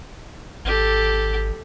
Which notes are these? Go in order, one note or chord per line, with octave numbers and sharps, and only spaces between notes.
G#1 G4 A4